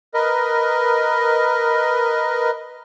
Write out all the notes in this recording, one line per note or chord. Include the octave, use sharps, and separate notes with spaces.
A#4 B4 D#5